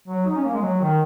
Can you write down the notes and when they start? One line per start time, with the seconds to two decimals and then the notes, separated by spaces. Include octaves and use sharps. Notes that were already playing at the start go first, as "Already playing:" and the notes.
0.08 F#3
0.26 D#4
0.36 C#4
0.44 A#3
0.53 G#3
0.62 F#3
0.81 D#3